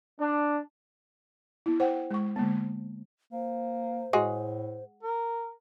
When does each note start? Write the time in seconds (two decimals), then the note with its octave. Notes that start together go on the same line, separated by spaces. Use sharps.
0.20 D4
1.66 B3 E4
1.80 C5 F#5 G5
2.11 G#3 C#6
2.36 D3 G#3 A#3 B3
3.33 A#3 C5
4.13 A2 G#3 F#4 G#4
5.03 A#4